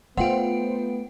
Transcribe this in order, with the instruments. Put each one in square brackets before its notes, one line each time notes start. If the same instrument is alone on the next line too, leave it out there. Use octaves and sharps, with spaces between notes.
[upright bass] A3 [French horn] B3 [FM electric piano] F4 C5 [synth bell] F#5 G5 D7